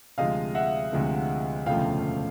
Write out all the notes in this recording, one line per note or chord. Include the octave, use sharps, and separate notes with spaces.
D2 C3 F3 G#3 D#5 F5
E5 F#5
D2 C3 F3 G#3
E1 D2 C#3 F3 A3 F5 G5